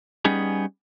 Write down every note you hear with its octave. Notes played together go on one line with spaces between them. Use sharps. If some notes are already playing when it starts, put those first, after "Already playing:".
G3 B3 C#4 D#4 G#4